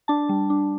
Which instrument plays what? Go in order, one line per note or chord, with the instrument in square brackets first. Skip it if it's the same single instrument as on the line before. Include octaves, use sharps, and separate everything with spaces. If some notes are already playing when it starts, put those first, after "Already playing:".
[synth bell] D4 A5
G3
D4